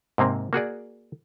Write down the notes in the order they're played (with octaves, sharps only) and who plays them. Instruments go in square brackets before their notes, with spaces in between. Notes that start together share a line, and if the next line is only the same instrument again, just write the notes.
[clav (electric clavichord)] G#2 C3 A#3 C4
A#3 F#4 G#4 D5